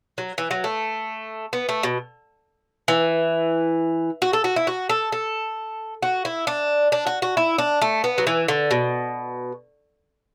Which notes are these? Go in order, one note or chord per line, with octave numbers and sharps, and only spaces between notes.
F#3
E3
F#3
A3
B3
A3
B2
E3
F#4
A4
F#4
E4
F#4
A4
A4
F#4
E4
D4
D4
F#4
F#4
E4
D4
A3
B3
F#3
E3
D3
B2